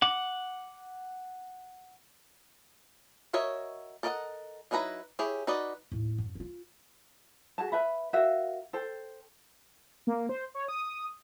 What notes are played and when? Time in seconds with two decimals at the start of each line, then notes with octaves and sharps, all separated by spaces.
0.02 F#5 D6
3.33 F#4 A#4 C#5 D#5 E5
4.03 A4 A#4 D#5 E5 F#5
4.71 F#3 D#4 E4 B4 A#5
5.19 E4 G4 G#4 C#5
5.47 D#4 F#4 B4 D5 D#5
5.92 D#2 A2
6.18 F#2
6.35 D#4 F4
7.58 F#4 G#4 A5
7.72 B4 E5 B5
8.13 F#4 A#4 E5 F5
8.73 A4 C5 G5
10.07 A#3
10.29 C5
10.54 C#5
10.68 D#6